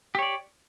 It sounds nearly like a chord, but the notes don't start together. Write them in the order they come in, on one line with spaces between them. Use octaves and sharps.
G4 C#5 D5